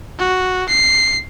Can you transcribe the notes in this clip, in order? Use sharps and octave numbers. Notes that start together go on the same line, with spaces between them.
F#4
C7